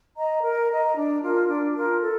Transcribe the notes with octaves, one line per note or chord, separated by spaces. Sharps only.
D#5 A#5
A#4
D#5 A#5
D4
F4 A#4
D4
F4 A#4
A4